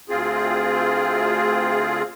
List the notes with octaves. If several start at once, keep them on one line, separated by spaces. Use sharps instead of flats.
D2 C4 F4 G#4